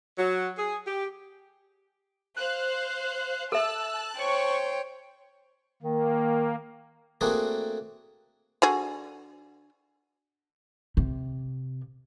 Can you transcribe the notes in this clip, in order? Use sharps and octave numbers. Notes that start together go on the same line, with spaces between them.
F#3
G#4
G4
C5 F5 F#6
A4 E5 A5 E6 F#6
C5 C#5 G5 C#6
D#3 A#3
A3 A#3 C4 D4 F#4 G#4
D3 F#4 G#4
C3